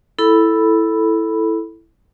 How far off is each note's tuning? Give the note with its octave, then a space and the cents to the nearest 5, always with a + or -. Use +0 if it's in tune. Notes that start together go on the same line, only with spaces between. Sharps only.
E4 +0 A4 +0 B5 +0